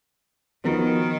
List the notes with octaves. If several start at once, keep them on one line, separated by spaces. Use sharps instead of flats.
D#3 F3 B3 D#4 F#4 A#4